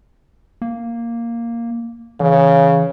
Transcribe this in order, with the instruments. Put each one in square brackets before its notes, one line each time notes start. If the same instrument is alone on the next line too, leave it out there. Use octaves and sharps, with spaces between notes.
[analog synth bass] A#3
[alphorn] C#3 [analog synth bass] E3